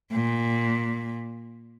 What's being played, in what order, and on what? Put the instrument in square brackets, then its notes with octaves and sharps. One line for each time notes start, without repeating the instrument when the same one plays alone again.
[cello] A#2